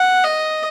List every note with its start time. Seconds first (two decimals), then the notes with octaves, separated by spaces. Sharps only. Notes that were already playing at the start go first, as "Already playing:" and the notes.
Already playing: F#5
0.24 D#5